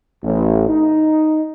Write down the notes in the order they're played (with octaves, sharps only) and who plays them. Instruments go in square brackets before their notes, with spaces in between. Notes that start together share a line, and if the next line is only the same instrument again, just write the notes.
[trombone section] A1
D#4